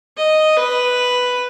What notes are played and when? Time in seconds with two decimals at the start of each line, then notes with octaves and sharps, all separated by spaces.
0.17 D#5
0.57 B4